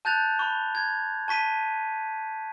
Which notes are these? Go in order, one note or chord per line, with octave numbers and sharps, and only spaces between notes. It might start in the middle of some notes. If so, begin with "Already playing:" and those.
A5 F#6 G6 A6 F7
B5 C#6
G#6
A5 C#6 B6 D#7